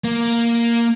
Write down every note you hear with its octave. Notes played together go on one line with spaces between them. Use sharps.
A#3